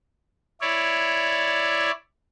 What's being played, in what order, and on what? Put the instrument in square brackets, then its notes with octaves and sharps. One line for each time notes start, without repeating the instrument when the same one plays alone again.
[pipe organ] E4 C#5 D5